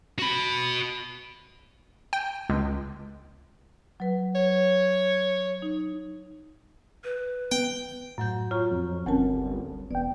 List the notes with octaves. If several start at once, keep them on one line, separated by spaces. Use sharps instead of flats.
F#4 B5
G5
C#2
F#3 B4
C#5
D#4
B4
B3 G5
F#2 A2 F#3 G6
F4 C#5 A#5 C#6
F2
G1 D2 C4 C#4 A#4 A5
E1 B3 D5 G5